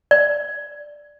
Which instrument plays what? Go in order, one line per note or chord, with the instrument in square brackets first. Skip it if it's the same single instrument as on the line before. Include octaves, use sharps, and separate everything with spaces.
[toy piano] D5